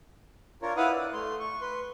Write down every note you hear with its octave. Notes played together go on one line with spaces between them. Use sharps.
D4 F4 A#4 C#5
E4 B4 F5 F#5 D#6
D5
A3 C6
C#6
B4 C6